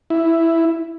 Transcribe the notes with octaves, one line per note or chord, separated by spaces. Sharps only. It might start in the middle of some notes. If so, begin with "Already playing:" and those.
E4